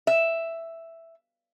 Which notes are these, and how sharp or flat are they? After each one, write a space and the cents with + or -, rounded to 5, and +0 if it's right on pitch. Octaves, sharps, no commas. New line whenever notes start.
E5 +5